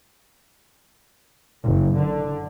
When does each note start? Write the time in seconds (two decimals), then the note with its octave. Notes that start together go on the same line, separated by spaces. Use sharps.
1.65 F#1
1.97 D3